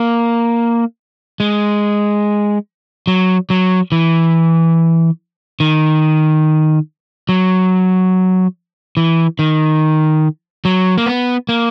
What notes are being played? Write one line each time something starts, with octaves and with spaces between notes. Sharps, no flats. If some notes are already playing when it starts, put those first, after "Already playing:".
Already playing: A#3
G#3
F#3
F#3
E3
D#3
F#3
E3
D#3
F#3
A#3
B3
A#3